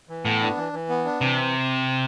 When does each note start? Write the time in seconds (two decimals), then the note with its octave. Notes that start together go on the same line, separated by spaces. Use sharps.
0.09 E3
0.25 A2 B3
0.41 D4
0.57 E3
0.73 E3
0.89 B3
1.05 D4
1.21 C3 E3